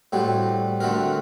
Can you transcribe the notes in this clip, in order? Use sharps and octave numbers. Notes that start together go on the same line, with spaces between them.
A2 G3 C4 F#4
D3 A3 C4 F#4 A#4